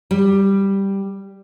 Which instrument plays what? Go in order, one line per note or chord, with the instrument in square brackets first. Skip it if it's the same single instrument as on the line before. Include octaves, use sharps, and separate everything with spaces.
[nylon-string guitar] G3